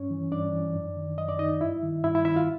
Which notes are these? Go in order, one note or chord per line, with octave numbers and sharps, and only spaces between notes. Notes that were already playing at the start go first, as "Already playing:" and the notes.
Already playing: G2 C#4 C#5
E3
G2 D4 D5
E3
F#2
D#3
F#2 D#5
D5
D#3 D#4 D#5
G2 E4 E5
D#3
G2 E4 E5
E4 E5
D#3 E4 E5
F4 F5